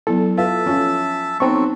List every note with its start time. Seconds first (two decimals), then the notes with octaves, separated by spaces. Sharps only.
0.07 F#3 B3 E4 A4
0.38 F4 B4 E5 A5
0.66 F3 C#4
1.40 F#3 B3 C4 D#4 A4 C#6